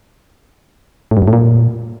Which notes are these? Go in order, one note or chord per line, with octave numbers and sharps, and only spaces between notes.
A2
G2
F#2
A2
A#2